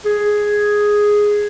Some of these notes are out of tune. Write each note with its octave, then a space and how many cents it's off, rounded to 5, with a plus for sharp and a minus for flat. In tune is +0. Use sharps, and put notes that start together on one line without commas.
G#4 +0